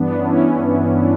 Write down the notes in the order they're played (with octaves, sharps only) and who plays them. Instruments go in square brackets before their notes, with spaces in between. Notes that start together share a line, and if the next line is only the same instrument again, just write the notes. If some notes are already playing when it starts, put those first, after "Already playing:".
Already playing: [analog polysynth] G2 E3 B3 D4
C#4 E4
D4 F#4